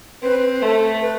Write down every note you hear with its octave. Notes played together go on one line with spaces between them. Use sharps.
C4 B4
A3 A4
B4